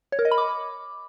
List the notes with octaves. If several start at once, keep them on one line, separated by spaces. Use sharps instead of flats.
C#5
A#4
D#5
B5
D6